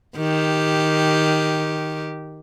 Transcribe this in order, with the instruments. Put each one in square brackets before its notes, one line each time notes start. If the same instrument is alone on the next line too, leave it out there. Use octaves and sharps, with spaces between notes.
[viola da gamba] D#3 G4